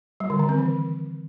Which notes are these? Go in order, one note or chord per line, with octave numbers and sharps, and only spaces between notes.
G3
D3
D#3
C4
E3